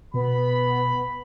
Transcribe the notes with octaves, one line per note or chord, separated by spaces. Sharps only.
B2 B3 B5